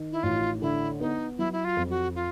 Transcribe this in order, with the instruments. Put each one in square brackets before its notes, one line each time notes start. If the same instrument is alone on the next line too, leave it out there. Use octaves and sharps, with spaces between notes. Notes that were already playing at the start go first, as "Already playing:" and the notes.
Already playing: [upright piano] D#3
[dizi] E4
[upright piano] A1 [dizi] F4
[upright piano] D3 [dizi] E4
[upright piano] B3 [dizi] D#4
[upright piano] F#3 [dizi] E4
[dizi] E4
F4
[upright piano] F2
[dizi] F#4
F4